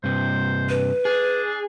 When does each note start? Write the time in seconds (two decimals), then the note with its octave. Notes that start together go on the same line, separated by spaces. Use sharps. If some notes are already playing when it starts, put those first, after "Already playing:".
0.04 G2 C3 C5
0.69 B4
1.05 D4 G#4